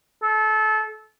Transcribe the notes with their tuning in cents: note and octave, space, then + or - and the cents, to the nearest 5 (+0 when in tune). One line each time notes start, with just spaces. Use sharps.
A4 -25